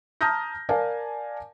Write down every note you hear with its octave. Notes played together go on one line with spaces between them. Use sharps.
A5 A#5 D#6 F6 G6 A#6
A#4 D5 F5 G#5 A5